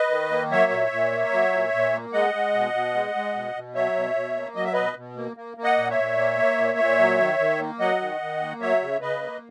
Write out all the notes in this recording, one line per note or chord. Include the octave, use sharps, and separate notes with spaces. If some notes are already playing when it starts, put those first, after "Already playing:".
Already playing: B4 D#5
D#3
A#3
F#3 C#5 E5
A#2
A#2
A#3
F#3
A#2
A#2
A#3
G#3 D#5 F#5
G#3
B2
B2
G#3
G#3
B2
B2
F#3 C#5 E5
B2
B2
A#3
F#3 D#5
E5
B2 B4 D#5
B2
A#3
A#3
A#3
D#5 F#5
A#2
C#5 E5
A#2
A#3
A#3
A#2
A#2
F#3
D#3
D#3
A#3
F#3 D#5 F#5
D#3
D#3
A#3
F#3 C#5 E5
C#3
C#3 B4 D#5
A#3